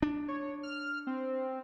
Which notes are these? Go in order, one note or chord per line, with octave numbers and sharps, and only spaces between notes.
D4
C#5
F6
C4